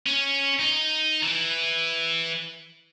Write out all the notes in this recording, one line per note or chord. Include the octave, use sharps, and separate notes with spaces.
C#4
D#4
E3